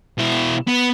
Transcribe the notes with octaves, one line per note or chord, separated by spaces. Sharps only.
B2 E4
B3